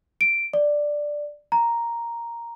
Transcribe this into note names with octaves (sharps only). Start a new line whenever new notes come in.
D7
D5
A#5